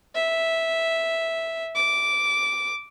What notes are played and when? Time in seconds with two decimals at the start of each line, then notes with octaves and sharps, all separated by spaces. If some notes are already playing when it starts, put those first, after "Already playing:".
0.15 E5
1.76 D6